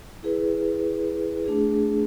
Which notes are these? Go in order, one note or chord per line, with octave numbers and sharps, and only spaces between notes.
E4 G#4 B4
A3 D4 G#4